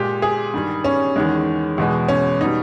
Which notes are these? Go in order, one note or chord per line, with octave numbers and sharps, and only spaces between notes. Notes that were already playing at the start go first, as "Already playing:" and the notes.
Already playing: A#2 G#3 G4
G#4
G2 D#3 G3
C#4
E2 D#3 G#3
E2 B2 G#3
C#4
B2 G3 D#4